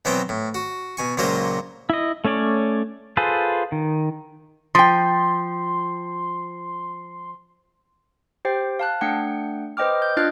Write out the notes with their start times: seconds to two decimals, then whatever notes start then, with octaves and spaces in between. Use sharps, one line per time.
0.05 B2 E3 F#3 B3 C4 G5
0.29 A2
0.54 F#4
0.97 B2 G#5 C#6
1.17 C#2 A#2 F#3 A#3 F4 C5
1.90 E4 D#5
2.25 A3 C#4 C#5 D5
3.17 F4 G#4 A4 B4 C5
3.72 D#3
4.75 F3 G5 C6
8.45 G4 C5 G5
8.79 F5 A5 F#6
9.01 A3 D4 F#5 G5 C#7
9.77 B4 C5 D#5 G5 D6 F6
10.02 G6
10.17 D4 F4 D#5 F6 F#6 A6